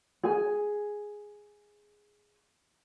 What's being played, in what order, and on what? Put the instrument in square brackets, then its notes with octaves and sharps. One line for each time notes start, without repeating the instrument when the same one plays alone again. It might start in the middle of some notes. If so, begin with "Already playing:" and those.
[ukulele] G#4 G#5